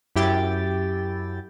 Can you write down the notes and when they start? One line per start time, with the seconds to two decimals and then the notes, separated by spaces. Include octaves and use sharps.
0.16 F#2 E4 G4 G5 A6